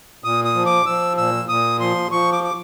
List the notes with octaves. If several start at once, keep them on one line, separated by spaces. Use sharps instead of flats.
A#2 D#6
D#6
F3
D6
F3 E6
A#2 E6
A#2 D#6
F3 C6
F3 C#6
D6
D6